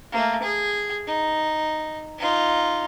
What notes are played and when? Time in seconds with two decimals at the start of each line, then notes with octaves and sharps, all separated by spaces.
0.12 A3 A#3
0.43 G#4
1.07 D#4
2.19 D#4 F4